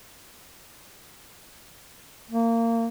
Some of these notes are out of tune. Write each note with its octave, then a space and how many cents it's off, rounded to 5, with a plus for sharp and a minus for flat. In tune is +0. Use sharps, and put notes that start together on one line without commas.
A#3 -25